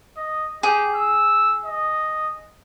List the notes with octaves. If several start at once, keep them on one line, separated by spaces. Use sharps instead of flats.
D#5
G4 G#4
E6
D#5